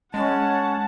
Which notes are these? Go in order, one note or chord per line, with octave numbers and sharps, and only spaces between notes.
G#3 C#4 F#5 A5